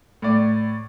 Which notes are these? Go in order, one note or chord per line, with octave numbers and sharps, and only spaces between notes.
A2 D5